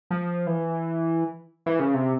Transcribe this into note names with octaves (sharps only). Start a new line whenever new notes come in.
F3
E3
E3
C#3
C3